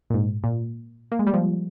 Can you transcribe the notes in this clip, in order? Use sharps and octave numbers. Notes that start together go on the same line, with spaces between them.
A#2
G#2
A#2
A#3
G#3
G3
F3